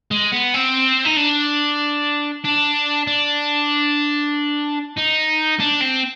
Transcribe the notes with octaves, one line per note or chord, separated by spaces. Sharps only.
G#3
B3
C4
D#4
D4
D4
D4
D#4
D4
C4